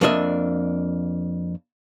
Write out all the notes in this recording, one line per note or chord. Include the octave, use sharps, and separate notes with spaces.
F2 A#3 D4 D#5 E5